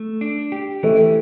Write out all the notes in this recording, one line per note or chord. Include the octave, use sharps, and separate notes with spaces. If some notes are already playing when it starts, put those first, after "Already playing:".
Already playing: A3
D4
G4
E3 A3